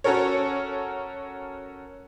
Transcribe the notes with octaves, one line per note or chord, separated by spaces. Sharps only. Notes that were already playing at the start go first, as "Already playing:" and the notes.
C#4 F#4 A4 A#4 C#5